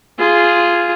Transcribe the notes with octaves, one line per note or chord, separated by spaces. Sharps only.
F4 G#4